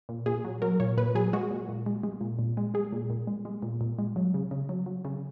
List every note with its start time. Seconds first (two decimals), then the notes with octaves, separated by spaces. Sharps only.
0.09 A#2
0.26 A#2 G#4
0.45 F#3
0.62 F#3 A#4
0.80 A#2 C#5
0.97 A#2 B4
1.15 F#3 G#4
1.33 G#3 F#4
1.51 A#2
1.69 A#2
1.86 G#3
2.03 G#3
2.21 A#2
2.39 A#2
2.57 G#3
2.74 G#3 G#4
2.92 A#2
3.10 A#2
3.27 G#3
3.45 G#3
3.62 A#2
3.81 A#2
3.99 G#3
4.16 F#3
4.34 C#3
4.51 C#3
4.69 F#3
4.86 F#3
5.05 C#3